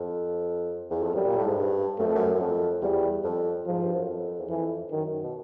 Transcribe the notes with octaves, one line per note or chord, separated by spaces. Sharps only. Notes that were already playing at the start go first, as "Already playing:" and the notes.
Already playing: F2
E2
F2
F#2 G3
A#2
A2
G#2
G2
F#2 A3
F2
F#2
F#2
F2
E2 G3
F2
G#2 F3
G2
F#2
F2
E2
F2 E3
F#2 D#3
B2